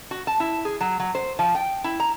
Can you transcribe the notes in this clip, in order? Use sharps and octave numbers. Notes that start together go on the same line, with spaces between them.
F#4
A5
E4
G#4
F#3
F#3
C5
F3
G5
E4
A#5